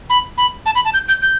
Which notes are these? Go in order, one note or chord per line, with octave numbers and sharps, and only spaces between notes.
B5
B5
A5
B5
A5
G6
G6
G6